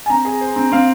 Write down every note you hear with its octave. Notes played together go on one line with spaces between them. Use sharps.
G#5
C4 A#5
G#4
C5
C4
C4 F5